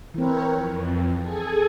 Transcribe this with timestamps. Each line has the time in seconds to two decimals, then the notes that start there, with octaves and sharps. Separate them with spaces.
0.14 E3 C4 A#4 B4 C#5
0.53 F2
1.19 G#4 A4 G#5